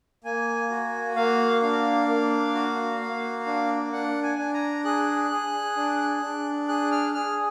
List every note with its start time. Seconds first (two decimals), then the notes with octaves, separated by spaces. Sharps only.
0.24 A#3 G#5
0.70 F#4
1.16 A#3 F5
1.62 D4 F5
2.08 A#3
2.54 F#4
3.01 A#3
3.46 D4
3.92 D4 F#5
4.23 G#5
4.38 D4
4.54 A#5
4.85 G#4 F#6
5.31 G#4
5.76 D4
6.22 D4
6.68 G#4 F#6
6.91 F6
7.14 G#4 F6